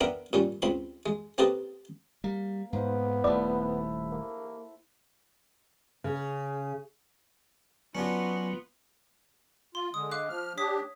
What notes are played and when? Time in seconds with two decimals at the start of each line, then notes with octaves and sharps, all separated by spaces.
0.01 B3 D4 A#4 E5 G5
0.33 A#2 G3 C#4
0.62 C#2 C4 B5 C6
1.06 G#3
1.38 A#3 C4 G4 A4 B4 D#5
2.24 G3 A#3
2.73 G#2 A#3 B3 C5 F#5
3.24 D#1 D#2 A3 E4 A4 D5
4.12 A#3
6.04 C#3
7.95 F#3 B3 C#4 D4 F4 F#4
9.75 F4 C6
9.94 D3 G#3 D#6
10.11 F5 D6 F#6
10.29 F3 F6
10.58 D4 G4 C#5 D#6 B6